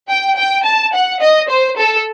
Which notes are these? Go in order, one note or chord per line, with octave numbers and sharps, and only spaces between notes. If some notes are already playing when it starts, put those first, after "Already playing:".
G5
G5
A5
F#5
D#5
C5
A4